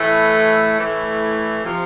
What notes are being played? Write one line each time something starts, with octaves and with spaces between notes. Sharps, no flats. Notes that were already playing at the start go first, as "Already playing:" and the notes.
Already playing: A2 E3 A3
A2 E3 A3
C3 F3